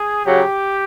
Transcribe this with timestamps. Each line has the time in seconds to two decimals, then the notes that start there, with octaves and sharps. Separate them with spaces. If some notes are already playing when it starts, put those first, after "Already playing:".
Already playing: G#4
0.26 C#3 F#3 G4